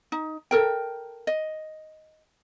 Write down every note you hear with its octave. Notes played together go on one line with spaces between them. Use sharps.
D#4
A4 A#4 G5
D#5